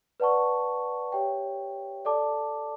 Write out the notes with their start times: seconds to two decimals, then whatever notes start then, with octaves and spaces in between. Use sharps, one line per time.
0.20 B4 D5 F#5 A5 C#6
1.12 G4 C#5 E5 G5
2.05 A4 D5 A5 D6